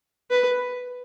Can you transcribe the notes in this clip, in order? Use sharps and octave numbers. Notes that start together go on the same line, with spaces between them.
B4